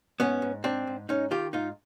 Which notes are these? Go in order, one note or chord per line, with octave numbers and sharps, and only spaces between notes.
G#2 B3 C#4
G#2
G#2 C4 D4
G#2
G#2 C#4 D#4
D#3 F4 G4
G#2 D#4 F4